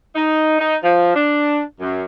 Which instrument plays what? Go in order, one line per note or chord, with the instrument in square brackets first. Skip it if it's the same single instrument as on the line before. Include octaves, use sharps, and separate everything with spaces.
[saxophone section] D#4
D#4
F3
D4
F#2